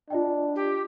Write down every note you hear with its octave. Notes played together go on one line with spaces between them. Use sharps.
D4 F4 D#5 G5
G4